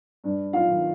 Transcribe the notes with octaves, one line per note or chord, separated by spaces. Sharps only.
G2
F4 F5
D#3